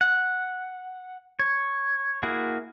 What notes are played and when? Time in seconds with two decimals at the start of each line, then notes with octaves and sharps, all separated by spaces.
0.01 F#5
1.39 C#5
2.23 A#3 E4 F#4 G#4